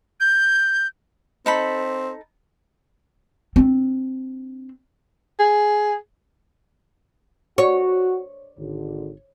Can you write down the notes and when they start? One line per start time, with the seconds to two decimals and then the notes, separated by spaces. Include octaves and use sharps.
0.20 G6
1.46 C4 D#4 A4 B5
3.56 C4 D4
5.39 G#4
7.58 F#4 C#5
8.58 G#1 D3